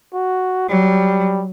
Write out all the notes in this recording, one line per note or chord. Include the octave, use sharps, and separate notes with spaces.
F#4
F#3 G3